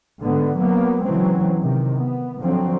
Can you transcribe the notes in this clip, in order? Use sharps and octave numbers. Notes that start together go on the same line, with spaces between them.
G#2 D3 B3
F#3 A#3 B3
C#3 E3 F#3 G#3 C4
C3 D#3
B3
D3 F3 F#3 C4